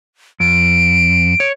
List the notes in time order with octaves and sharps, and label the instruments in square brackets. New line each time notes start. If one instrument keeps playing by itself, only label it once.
[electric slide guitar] F2 [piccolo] D7
[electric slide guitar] C#5